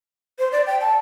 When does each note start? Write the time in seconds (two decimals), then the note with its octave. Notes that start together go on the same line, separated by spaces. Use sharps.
0.39 C5
0.52 D5
0.67 G5
0.81 A5